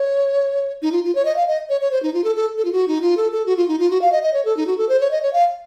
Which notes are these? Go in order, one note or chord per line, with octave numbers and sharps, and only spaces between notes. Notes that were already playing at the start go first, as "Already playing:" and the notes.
Already playing: C#5
D#4
F4
F4
C#5
D#5
F5
D#5
C#5
C#5
C5
D#4
F4
A4
A4
A4
F4
F#4
D#4
F4
A4
A4
F#4
F4
D#4
F4
F#4
F5
D#5
D#5
C#5
A4
D#4
F#4
A4
C5
C#5
D#5
C#5
F5